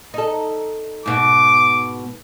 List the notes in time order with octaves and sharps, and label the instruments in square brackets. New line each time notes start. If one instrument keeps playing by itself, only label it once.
[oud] D#4 A4
[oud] G#2 B2 [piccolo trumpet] D6